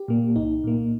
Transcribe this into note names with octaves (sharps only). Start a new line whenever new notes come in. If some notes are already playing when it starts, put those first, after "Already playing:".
Already playing: G4
A#2 A#3
C2 D#4
A#2 A#3